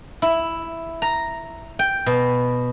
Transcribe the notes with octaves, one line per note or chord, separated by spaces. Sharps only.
E4
A#5
G5
B2